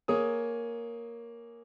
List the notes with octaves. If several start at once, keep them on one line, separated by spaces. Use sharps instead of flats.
A#3 G#4 C#5 D#6